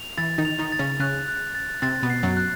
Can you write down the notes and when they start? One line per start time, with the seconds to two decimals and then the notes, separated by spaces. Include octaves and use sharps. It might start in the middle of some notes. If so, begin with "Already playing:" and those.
Already playing: F7
0.17 E3 E4 A6
0.38 D#3 D#4
0.45 F7
0.59 D#3 D#4
0.72 A6
0.79 C#3 C#4
1.00 C#3 C#4 F#6
1.28 F#6
1.55 A6
1.82 C3 C4 A6
2.03 B2 B3
2.10 C7
2.23 F#2 F#3
2.37 F#6